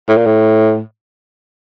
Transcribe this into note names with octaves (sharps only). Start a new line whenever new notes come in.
A2
A#2
A2